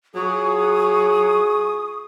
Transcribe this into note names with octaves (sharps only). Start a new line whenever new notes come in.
F#3 F4 G#4 C#6 D#6